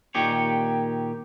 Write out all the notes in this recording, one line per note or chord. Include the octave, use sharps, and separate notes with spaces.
A#2 D#3 G4 C#5